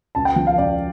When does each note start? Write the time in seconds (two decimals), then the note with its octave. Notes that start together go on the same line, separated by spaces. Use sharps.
0.15 C#2 A5
0.25 G5
0.36 F3
0.47 F5
0.58 C#2 D5